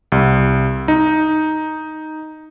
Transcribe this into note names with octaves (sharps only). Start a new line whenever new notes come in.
C2
D#4